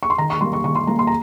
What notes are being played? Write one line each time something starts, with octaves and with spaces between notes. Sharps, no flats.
C#6
C6
D#3 A#5
C#6
G3 A#3 C6
C#6
D#3 C#6
C6
G3 A#3 A#5
C6
A#5